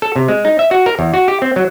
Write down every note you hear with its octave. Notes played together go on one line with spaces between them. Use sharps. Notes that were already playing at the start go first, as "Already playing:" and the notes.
A4
C3
G#3
D#4
E5
F#4
A#4
E2
F#4
G4
C4
F#3